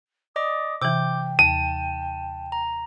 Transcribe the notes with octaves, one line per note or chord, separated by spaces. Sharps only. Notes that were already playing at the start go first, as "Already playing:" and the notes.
D5 D#5 D6 D#6
C3 E3 G5 D6 G6
D#2 A5 D#7
A#5